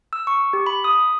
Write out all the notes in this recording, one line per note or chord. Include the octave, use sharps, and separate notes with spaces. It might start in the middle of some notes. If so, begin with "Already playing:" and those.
E6
C#6
G4
B5
D#6